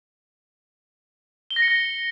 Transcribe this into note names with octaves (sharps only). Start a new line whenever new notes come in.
G7
A#6
C#7
A#6